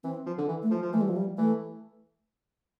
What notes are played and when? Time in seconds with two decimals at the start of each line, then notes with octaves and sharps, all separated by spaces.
0.04 E3 C4
0.26 F3
0.38 D3
0.48 E3
0.63 A3
0.71 F3
0.82 F3
0.93 E3 A3
1.01 G3
1.09 F3
1.16 G3
1.38 E3 A3